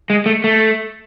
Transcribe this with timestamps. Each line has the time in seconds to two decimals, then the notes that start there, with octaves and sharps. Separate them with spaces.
0.10 G#3
0.26 A3
0.44 A3